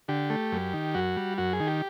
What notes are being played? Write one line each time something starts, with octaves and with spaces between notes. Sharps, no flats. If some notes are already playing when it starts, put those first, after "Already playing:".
D3 G4
A3
F#2
D#3
F#2 F#4
G3
F#2 F#4
G#4
D#3
G4